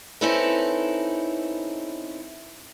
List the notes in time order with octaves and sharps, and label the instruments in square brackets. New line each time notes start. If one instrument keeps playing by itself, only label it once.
[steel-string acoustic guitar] C4 C#4 D#4 E4 A4 B4